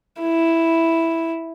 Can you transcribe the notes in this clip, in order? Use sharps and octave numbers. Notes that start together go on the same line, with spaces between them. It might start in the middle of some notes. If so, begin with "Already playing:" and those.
E4